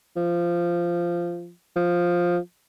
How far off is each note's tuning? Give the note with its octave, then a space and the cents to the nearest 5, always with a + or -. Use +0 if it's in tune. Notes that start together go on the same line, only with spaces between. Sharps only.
F3 -15
F3 +5